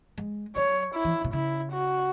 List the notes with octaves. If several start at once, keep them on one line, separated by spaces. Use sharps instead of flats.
G#3
F#3 C#5
E4
E3
B2
C#3 E4
F#4